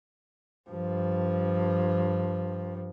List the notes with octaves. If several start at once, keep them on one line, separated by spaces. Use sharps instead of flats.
G2 F3